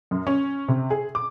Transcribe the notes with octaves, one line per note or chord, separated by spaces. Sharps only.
F#2
C#4
C3
G#4
D6